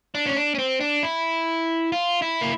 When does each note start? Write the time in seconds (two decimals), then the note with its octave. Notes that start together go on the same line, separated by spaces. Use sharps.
0.15 D4
0.26 C#4
0.37 D4
0.55 C#4
0.58 C4
0.81 D4
1.03 E4
1.92 F4
2.22 E4
2.41 A#3